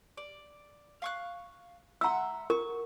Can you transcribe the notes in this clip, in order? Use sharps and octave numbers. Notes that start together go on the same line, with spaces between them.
D5
F5 C#6 F#6
E5 F#5 A#5 C6 E6
A#4 C#6